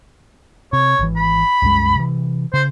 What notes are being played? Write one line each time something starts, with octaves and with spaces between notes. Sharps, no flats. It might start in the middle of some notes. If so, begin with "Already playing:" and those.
C3 C#5
G#1 E3
B5
C2 F#2 G#3
C3 E3
C#3 C5